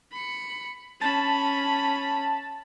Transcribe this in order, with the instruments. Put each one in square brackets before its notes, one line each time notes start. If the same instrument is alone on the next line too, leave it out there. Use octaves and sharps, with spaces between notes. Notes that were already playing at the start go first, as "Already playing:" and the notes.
[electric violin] B5 C#7
[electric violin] C#4 B5 [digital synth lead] A5